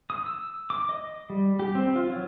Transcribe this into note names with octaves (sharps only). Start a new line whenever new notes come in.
D#6
E6
D6
D#5
G3
G4
C4
F4
F#3